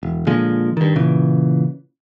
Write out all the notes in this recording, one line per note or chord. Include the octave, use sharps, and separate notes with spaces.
E1
A#2 D3 F3 G#3
G2 D#3
A#2 C#3 E3